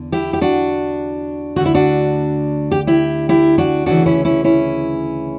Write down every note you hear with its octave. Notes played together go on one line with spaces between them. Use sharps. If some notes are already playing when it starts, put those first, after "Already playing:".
Already playing: E2 D3
E4 G4
G4
D4 F#4
D2 D3 F#4
E4
D4 F#4
G4
E4 G4
E4 G4
D4 F#4
D2 C#3 E3 D4 F#4
C#4 E4
C#4 E4
C#4 E4